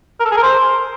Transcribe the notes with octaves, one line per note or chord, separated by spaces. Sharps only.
A#4
A4
G#4
A#4
C5